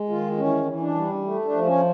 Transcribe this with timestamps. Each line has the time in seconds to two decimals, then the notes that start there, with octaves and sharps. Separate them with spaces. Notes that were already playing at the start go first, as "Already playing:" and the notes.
Already playing: G#3
0.09 D#3 F4
0.37 E3 C#4
0.66 E3
0.81 D4
0.95 G3
1.23 A3
1.45 D4
1.52 F3
1.66 C#4